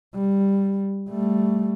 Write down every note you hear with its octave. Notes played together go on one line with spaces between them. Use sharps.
G3
G3 A3